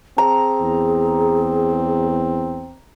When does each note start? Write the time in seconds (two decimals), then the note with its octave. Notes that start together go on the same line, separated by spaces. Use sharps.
0.18 C4 G#4 A#5
0.61 E2